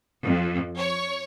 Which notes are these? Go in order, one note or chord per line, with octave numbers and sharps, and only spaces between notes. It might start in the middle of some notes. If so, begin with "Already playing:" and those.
F2
C#5